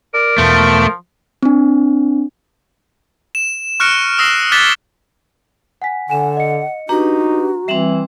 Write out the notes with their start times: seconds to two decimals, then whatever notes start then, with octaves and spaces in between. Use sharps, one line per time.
0.14 A#4 D5
0.38 E2 B2 F3 A3
1.43 C4 D4
3.35 E7
3.80 C#6 F6 F#6 A#6 C#7 D7
4.18 D#6 E6 A#6 C7 E7
4.52 D6 F#6 G#6 A6 B6 G7
5.82 F#5 G#5 B6
6.10 D3 F#5 G#5 E7
6.37 D#5 C#7
6.89 D4 D#4 F#4 G4 B4 A#5
7.68 E3 G3 C4 E5 E7 F#7